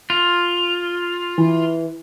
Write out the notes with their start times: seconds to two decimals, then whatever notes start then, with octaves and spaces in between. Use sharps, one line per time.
0.10 F4
1.38 E3